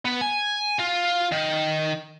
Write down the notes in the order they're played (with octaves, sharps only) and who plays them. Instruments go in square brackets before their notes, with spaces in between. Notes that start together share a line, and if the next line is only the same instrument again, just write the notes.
[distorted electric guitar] B3
G#5
F4
D#3